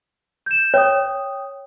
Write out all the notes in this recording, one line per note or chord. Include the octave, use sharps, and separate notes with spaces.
G6 E7
C#5 G5 D#6